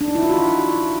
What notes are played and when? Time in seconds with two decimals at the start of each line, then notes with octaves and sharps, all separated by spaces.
0.01 D4
0.08 D#4
0.15 E4
0.23 F4
0.29 F#4